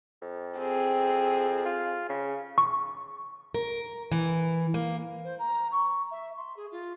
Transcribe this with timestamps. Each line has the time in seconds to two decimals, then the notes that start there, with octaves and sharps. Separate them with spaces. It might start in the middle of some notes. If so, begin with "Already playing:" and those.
0.22 F2
0.58 C4 G#4
1.66 F4
2.09 C#3
2.58 C#6
3.55 A#4
4.12 E3
4.74 A#3
5.24 C5
5.39 A#5
5.71 C#6
6.11 E5
6.36 C6
6.56 G#4
6.71 F4